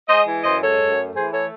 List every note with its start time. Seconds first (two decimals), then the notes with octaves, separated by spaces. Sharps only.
0.09 G#3 C5 D#5
0.27 E3
0.44 F#2 C5 D#5
0.61 G#3 A4 C#5
0.80 F#2
0.96 A3
1.14 E3 G#4 C5
1.31 A3 A4 C#5